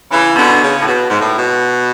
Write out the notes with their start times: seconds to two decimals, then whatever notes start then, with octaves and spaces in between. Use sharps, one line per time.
0.11 C#3 E3
0.36 B2 D3
0.62 C#3
0.81 A2
0.86 B2
1.10 G#2
1.20 A2
1.37 B2